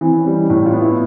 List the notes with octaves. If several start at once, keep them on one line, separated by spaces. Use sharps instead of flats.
E3 C4
C#4
G3
D#4
A2 E4
F4
B3
E4